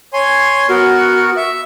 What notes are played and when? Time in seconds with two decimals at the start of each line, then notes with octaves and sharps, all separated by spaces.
0.13 C#5 G#5 C6
0.69 B3 F#4 A#4
1.37 E5